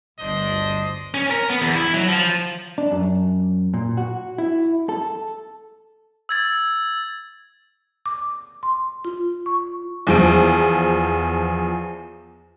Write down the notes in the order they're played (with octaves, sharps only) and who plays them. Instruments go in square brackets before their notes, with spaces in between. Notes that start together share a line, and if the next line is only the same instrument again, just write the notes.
[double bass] G1 D2 [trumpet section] D4 C5 D#5
[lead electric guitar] C#4
A#4
B3
E2
E4
F#3
F3
[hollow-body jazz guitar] D4
F#2
A#2
F#4
E4
A4
[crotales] E6 G#6 A6
[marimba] D6
C6
F4
C#6
[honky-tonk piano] E2 F3 D7